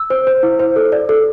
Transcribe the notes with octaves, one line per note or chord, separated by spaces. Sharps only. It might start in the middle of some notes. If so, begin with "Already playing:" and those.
Already playing: E6
C5
C5
E4
C5
A4
D5
A4